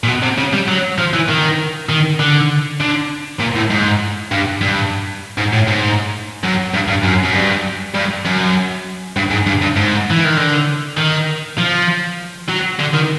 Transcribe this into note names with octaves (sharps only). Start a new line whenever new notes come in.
A#2
B2
C3
C#3
G3
F#3
F3
E3
D#3
D#3
D3
D3
A#2
A2
G#2
G2
G2
G#2
A2
G#2
F#2
G2
G2
F#2
F#2
G2
G2
F#2
G2
G#2
G2
G2
G#2
E3
D#3
D3
D#3
F3
F#3
D3
D#3